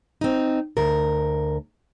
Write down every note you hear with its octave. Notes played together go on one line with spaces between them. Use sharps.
C4 D#4
D2 A#4